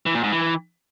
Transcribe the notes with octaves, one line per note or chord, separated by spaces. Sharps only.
E3
A#2
G#2
E3